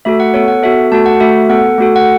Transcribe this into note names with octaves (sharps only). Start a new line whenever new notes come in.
A3 F#4 A4 E5
F#5
B3 A4 C#5
F#5
B3 F#4 A4 E5
A3 F#4 A4 A5
F#5
A3 F#4 A4 E5
B3 A4 F#5
A3 F#4 A4
F#5